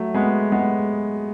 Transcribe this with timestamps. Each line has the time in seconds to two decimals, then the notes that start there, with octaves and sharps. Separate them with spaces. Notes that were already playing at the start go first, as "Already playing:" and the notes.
Already playing: F#3 A3
0.14 G#3 B3
0.52 G#3 B3